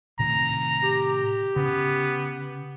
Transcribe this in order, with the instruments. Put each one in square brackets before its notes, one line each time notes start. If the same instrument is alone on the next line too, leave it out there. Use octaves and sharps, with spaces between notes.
[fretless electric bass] A2 C3 D#3 [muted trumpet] A#5
[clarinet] G4
[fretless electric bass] C#3 [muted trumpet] B3